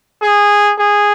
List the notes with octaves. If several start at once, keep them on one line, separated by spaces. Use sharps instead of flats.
G#4
G#4